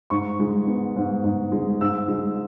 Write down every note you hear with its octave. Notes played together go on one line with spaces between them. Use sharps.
G#2 C#6
G#3
B3
G#2
G#2
G#3
G#2 E6
G#3